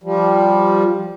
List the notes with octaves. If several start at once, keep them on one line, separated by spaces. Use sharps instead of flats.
F3 G3